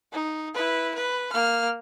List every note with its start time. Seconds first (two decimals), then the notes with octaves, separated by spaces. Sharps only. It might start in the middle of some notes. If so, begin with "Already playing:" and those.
0.13 D#4
0.54 E4 B4
0.95 B4
1.33 A#3 F6